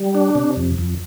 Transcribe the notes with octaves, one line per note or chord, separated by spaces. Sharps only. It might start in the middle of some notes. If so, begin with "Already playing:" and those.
Already playing: G3
D4
C3
F2
F2